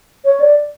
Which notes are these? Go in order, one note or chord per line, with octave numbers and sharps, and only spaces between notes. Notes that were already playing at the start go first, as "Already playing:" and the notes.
C#5
D5